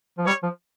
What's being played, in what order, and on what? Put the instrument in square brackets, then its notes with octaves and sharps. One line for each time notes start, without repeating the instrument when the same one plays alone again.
[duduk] F3
[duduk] G3 [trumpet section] C#5
[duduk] F3